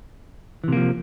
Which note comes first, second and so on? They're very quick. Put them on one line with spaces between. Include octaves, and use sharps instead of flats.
E3 C3 A#3 F3